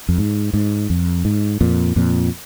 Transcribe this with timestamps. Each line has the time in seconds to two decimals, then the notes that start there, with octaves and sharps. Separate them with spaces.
0.09 F2
0.18 G#2
0.53 G#2
0.90 F2
1.25 G#2
1.61 F2 A#2
1.96 F2 A#2